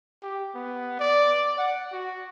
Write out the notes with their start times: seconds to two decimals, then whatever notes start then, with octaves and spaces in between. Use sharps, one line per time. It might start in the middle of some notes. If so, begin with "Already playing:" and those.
0.22 G4
0.55 B3
1.00 D5
1.58 F#5
1.92 F#4